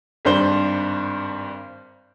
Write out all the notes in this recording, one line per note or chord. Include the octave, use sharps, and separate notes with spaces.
G#1 G2 D4 C5 G7